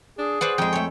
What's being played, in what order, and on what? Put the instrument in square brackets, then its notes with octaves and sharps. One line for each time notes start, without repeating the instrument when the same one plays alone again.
[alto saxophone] D4 [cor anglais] G#4
[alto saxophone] B4 [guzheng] C5 D5 F#5
[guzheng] F2 G#3 [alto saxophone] G5
[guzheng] A3 C#5